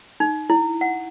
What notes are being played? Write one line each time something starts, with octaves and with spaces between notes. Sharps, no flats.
D#4
E4
F#5